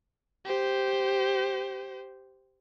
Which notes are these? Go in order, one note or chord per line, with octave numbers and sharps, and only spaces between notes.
G4 C5